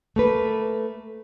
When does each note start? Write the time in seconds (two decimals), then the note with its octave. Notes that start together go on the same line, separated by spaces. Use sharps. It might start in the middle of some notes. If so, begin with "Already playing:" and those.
0.16 A3 A#3 B4